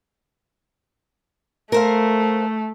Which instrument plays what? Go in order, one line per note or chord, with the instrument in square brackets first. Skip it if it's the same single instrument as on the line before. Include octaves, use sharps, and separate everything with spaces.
[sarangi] A3 [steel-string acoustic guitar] A#4 C5 F5